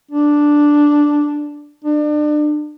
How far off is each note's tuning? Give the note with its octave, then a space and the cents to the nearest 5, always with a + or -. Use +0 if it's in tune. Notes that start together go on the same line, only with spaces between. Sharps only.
D4 +0
D4 +35